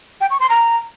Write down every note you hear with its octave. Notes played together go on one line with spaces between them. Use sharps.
G5
C#6
C6
A#5